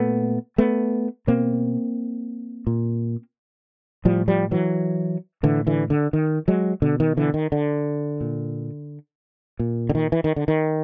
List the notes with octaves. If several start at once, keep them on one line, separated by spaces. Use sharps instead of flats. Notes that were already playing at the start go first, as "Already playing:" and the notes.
Already playing: A#2 A3 B3
A3 B3
B2 A#3 C4
A#2
A2 F3 G3
F3 G3
E3 F#3
A2 D3 E3
D3 E3
D3
D#3
F#3 G#3
B2 D3
D#3
D3 E3
D#3
D3
A#2
A#2
D3
D#3
E3
D#3
D3
D#3